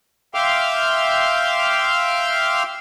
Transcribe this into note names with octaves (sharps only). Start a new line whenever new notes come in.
E5 F5 G5 C6 D6 F6